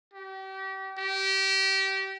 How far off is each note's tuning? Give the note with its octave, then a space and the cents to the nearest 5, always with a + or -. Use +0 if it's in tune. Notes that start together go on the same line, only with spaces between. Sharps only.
G4 -35
G4 -25